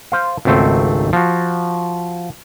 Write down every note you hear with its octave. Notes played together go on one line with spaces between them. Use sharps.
C5 F5
G#1 C#2 G#2 A3 C4
F3 F#4